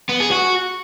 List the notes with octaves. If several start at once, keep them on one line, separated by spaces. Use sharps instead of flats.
B3
G#4
F#4